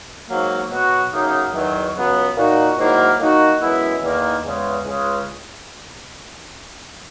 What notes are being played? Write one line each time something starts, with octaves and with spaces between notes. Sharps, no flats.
G#2 F#3 A#3
B2 F#3 B3 F#4
F#2 C#3 F#3 A#3 D#4
E2 D#3 F#3
C#2 C#3 F#3 B3
A#2 A#3 D#4 F#4
G#2 D#3 F#3 A#3 E4
D#3 A#3 D#4 F#4
F#2 E3 G#3 B3 E4
E2 D#3 A#3
E2 C#3 G#3
C#2 C#3 G#3